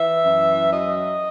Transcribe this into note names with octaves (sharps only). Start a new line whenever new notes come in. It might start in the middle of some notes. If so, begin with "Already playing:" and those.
Already playing: E3 E5
F#2
F#3 D#5